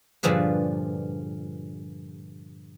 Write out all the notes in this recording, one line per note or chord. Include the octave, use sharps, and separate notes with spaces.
G2 A#2 D3 F3 G#4 B4